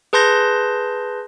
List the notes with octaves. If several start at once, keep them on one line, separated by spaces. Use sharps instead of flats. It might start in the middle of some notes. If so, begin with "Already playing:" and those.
G#4 B4 A5 C6 G6 A#6